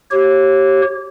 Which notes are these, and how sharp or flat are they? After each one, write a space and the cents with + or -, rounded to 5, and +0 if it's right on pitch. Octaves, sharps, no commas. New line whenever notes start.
G4 -20 C#5 -30